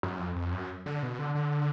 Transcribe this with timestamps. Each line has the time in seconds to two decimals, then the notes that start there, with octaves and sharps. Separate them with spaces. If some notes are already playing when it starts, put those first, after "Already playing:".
0.03 F#2
0.19 F2
0.36 F2
0.53 F#2
0.86 D3
1.03 B2
1.19 D3
1.35 D3